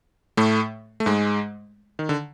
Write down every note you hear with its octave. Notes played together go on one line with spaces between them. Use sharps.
A2 A3
A3
G#2 G#3
D#3
D3